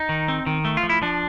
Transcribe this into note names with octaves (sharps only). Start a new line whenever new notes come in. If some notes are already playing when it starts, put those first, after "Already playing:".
Already playing: D#4
D#3
C4
D#3
A3
F4
F3
E4
F3 D4